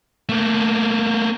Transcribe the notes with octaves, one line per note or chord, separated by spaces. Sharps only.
A3 A#3